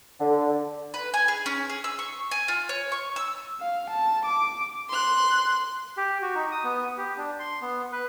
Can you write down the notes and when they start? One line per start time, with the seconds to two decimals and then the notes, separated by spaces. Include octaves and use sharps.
0.20 D3
0.94 B4
1.14 G#5
1.28 G#4
1.46 C#4
1.69 G#4
1.84 E6
1.99 C#6
2.31 G#5
2.48 F4
2.69 C#5
2.92 C#6
3.16 E6
3.61 F5
3.90 A5
4.26 D6
4.89 C6 F#6
5.97 G4
6.22 F#4
6.35 D#4
6.52 D#6
6.64 B3
6.98 G4
7.17 D4
7.40 C6
7.62 B3
7.92 B4